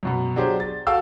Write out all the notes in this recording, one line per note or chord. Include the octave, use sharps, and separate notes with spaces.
F#2 B2 B3
F#3 D4 G4 G#4 C5
A6
F#4 A4 F5 G5 E6